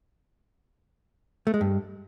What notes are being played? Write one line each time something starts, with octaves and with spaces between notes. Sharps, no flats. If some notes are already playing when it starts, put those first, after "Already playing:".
A3
G#3
G2